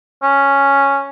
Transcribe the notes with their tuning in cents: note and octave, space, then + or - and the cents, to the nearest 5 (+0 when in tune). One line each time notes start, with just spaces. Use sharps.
C#4 +0